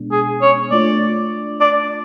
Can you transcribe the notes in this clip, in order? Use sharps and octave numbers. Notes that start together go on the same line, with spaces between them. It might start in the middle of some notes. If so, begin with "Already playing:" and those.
Already playing: B2 G#3 B3 D4
G#4
C#5
A3 D4 F4 D5
D5